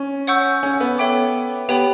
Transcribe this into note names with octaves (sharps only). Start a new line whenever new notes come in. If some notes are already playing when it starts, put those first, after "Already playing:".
Already playing: C#4
C#5 F#5 C#6 E6 G6
C#4
B3
A4 C#5 E5 G5 D6
B3 G4 C#5 G5 B5